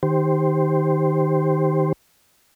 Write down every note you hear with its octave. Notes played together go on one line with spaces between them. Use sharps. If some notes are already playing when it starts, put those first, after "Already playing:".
D#3 G4 C5